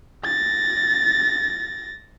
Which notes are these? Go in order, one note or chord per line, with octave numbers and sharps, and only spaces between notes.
A6 A#6